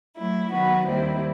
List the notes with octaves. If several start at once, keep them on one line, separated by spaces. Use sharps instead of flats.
F#3 A3 E4
D#3 F#3 B3 F#4 B4
D#2 D#3 G3 C4 E4